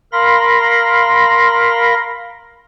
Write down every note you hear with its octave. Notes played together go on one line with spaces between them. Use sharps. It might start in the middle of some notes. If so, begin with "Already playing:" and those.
A#4 F5 B5 C6 A#6